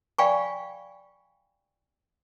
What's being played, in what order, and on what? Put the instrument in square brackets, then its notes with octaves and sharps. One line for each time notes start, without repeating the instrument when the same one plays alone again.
[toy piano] D5 F5 G5 G#5 B5 C#6